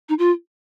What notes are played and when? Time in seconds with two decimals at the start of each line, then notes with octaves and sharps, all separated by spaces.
0.09 D#4
0.19 F4